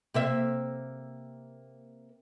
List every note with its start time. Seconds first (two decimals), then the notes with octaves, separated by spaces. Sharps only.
0.14 C3 A#3 E5